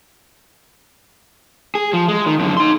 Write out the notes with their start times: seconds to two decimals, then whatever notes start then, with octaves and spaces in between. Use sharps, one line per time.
1.75 G#4
1.93 F3
2.08 G#3
2.26 D#3
2.39 F#2 D3
2.57 D#4 C6